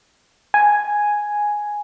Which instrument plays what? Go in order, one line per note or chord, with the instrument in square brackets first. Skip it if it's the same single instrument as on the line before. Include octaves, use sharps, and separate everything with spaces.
[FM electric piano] G#5